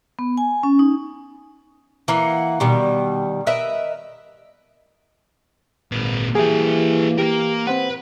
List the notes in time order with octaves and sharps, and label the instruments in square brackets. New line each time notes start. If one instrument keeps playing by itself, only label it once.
[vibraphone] B3
G#5
C#4
D#4
[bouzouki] E3 A#3 F#5
B2 D#3 G3
A#4 B4 D#5 E5
[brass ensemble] G#1 [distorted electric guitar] A#2 B4
[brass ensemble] E3 [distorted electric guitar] A#3 E5 [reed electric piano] G4 G#4
[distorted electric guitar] A#3 A#4 [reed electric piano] G4
[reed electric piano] C4 C5 F#5 [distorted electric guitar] B4